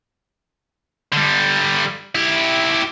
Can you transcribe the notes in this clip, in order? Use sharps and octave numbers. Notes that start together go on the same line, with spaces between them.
D3 G3
E4 G4